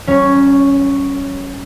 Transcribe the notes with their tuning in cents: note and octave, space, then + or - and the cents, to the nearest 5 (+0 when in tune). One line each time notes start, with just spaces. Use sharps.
F#3 +45 C#4 +0 C#5 +5